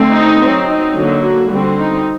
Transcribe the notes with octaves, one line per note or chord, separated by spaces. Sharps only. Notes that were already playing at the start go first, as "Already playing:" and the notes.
Already playing: D3 A3 C4
D#4
F#3 C4
D#4
D3 F#3 A#3
F#4
D3 G3 C4
D#4